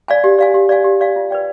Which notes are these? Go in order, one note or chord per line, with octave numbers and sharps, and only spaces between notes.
D5 F5 G#5
G4
D5 F5 G#5
G4
D5 F5 G#5
G4
D5 F5 G#5
F4
B4 D5 G5